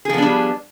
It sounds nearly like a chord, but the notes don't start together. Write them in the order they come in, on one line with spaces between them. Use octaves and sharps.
G#4 F3 B3 D4 G3